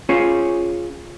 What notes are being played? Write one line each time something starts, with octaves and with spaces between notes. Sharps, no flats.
C#4 F4 G#4 C5 C#5